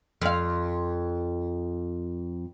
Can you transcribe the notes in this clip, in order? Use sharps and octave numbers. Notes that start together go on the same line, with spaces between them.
F2 F5